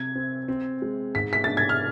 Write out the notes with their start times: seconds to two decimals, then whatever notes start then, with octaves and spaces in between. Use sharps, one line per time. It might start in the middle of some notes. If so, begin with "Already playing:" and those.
Already playing: C3 G#6
0.15 C4
0.48 C4
0.82 G#3
1.15 G#2 B6
1.33 B6
1.44 D4 A6
1.57 G#6
1.69 F6